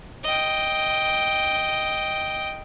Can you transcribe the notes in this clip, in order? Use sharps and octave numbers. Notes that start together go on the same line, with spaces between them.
D#5 G5